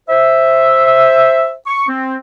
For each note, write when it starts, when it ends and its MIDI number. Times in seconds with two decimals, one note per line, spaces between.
0.09 1.52 72
0.09 1.52 76
1.67 1.87 85
1.88 2.15 60